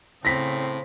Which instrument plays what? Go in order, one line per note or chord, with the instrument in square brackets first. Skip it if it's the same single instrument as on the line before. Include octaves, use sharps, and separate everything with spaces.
[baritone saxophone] A2 [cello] C#3 [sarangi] C4 [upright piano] A#6 B6